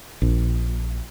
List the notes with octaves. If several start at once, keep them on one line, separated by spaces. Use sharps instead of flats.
A#1